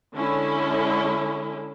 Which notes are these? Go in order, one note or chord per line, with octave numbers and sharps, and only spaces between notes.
D3 G#3 C#4 E4